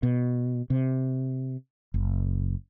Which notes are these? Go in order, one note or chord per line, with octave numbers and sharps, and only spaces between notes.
B2
C3
F#1